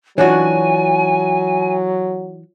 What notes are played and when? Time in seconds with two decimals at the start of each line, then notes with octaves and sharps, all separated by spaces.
0.18 E3 F#3 D4 F4 F#4 C#5 G#5